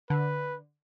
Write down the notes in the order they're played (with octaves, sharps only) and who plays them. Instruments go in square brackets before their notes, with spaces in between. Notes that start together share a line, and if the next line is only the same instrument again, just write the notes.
[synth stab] D3 [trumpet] B4